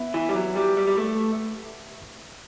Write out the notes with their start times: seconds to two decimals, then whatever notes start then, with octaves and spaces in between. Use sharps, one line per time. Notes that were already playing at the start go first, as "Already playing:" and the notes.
Already playing: B3 E4
0.14 E3
0.29 G3
0.35 F#3
0.56 G3
0.77 G3
0.87 G3
0.97 A3